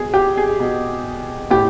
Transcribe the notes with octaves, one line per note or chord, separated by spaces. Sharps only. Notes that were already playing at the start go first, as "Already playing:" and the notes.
Already playing: B2 G#4
G4
G#4
B2
A2 G4